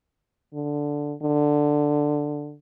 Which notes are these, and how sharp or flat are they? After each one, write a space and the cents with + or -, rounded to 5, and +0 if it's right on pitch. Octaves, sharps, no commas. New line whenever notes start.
D3 -5
D3 +5